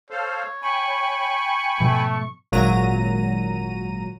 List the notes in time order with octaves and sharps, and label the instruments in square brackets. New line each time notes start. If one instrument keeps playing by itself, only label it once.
[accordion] A4 C5 F5 [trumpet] C#5
[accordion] G5 G#5 B5 [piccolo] C#6
[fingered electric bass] G#2 B2 F3 [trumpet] A3
[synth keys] G#1 A#2 F#3 A#5 D#7